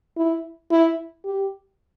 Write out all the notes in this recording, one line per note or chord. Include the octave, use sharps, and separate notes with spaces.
E4
E4
G4